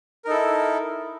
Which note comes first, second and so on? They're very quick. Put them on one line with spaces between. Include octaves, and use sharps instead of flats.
A#4 D#4 A4 E4